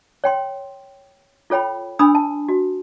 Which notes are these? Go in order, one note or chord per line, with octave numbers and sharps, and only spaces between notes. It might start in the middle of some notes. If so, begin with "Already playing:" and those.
C#5 G5 C6
F4 A4 C#5 G5 B5
D4 G#5 B5 D#6 E6
A5
F#4